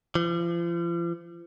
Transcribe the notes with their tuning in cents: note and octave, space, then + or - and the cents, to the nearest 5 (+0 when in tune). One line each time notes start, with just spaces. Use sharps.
F3 -40